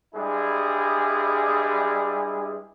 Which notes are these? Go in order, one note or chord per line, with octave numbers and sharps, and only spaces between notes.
G2 G3 G#3 E4 G#4